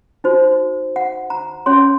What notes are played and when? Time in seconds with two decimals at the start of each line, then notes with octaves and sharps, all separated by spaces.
0.24 D#4 F#4 C5
0.96 F#5
1.30 A#5
1.66 C#4 G#4 C#5 C6